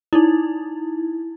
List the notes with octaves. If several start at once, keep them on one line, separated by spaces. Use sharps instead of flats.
D#4 E4